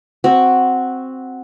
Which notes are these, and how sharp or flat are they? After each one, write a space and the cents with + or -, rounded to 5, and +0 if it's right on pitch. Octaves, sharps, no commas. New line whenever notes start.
C4 +0 F#4 +0